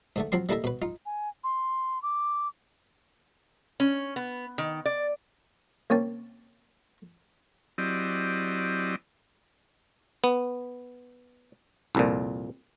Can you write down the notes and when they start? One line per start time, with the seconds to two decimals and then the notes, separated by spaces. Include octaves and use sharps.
0.16 G#2 D3 A3
0.32 F3 F#3 C4 C6
0.49 G3 A#3 E4 A4 D#5 E5
0.64 B2 B4
0.82 D#4 F4
1.06 G#5
1.44 C6
2.03 D6
3.80 C#4
4.16 B3
4.58 D#3
4.85 D5
5.90 C2 A#3 C#4 G5 A5
7.78 F#3 C4 E4 G4 D5 D#5
10.24 B3
11.95 C2 F2 A#2